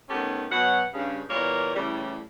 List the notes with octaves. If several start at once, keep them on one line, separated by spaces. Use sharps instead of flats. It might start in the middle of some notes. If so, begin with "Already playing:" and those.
D#3 A3 B3 C#4 G4
B2 F#3 F#5
G2 C#3
E2 A#2 G3 A#3 A#4 C#5
A2 C#3 E3 G3